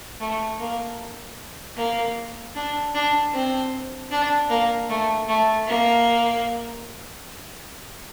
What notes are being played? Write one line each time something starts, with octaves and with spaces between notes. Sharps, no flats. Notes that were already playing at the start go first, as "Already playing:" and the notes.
A3
A#3
A#3
D4
D4
C4
D4
A#3
A3
A3
A#3